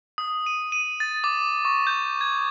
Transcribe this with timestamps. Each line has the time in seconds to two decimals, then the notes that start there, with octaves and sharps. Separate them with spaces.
0.18 D#6
0.46 D#7
0.72 D#7
1.00 A6
1.24 D6
1.65 C#6
1.87 G6
2.21 G#6